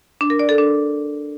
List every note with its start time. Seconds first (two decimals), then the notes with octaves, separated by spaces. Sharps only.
0.21 D4
0.30 A#4
0.39 D5
0.49 A4
0.58 D4